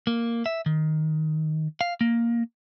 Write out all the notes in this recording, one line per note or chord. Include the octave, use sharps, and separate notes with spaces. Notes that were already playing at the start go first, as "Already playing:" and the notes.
A#3
E5
D#3
F5
A#3